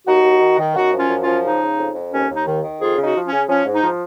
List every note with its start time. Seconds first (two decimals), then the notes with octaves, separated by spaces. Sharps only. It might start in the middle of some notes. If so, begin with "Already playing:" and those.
0.07 D#2 D#4 F#4
0.24 D#2
0.41 D#3
0.58 D#3
0.76 F#2 D#4 F#4
0.93 F3
0.98 C#4 F4
1.10 F#2
1.22 C#4 F4
1.27 F3
1.44 C#3 D#4
1.61 C#3
1.79 F2
1.95 F2
2.13 D#2 C#4
2.29 D#2
2.35 D#4
2.46 D#3
2.64 D#3
2.80 F2 F4 G#4
2.98 C#3
3.03 D#4 F#4
3.15 F3
3.26 C#4
3.32 C#3
3.48 F3 C#4
3.66 G#2
3.72 D#4
3.83 F3